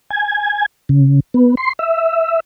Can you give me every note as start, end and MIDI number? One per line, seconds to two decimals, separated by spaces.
0.10 0.66 80
0.89 1.20 49
1.34 1.55 59
1.57 1.73 84
1.79 2.40 76